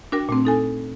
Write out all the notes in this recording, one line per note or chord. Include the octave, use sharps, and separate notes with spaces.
D4 F#4 A#4 G5
A#2 A3 C4
D#4 A4 G#5